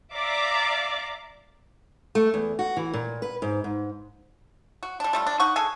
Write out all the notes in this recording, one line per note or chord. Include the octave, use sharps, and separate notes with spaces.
D5 E5 F5 A#5 D6
A3
E2
F#4
E3
A#2
B4
G#2
G#2
F#4
G3 D4
G3 A3 F4
D4
D#4 F#5 C#6
G#3 G#4 A4 G#5